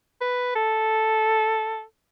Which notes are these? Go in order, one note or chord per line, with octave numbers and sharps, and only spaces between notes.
B4
A4